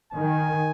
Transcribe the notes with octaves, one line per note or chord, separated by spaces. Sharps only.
D#3 G#5